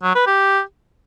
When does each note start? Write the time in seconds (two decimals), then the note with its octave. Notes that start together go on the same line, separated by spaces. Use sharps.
0.03 F#3
0.15 B4
0.27 G4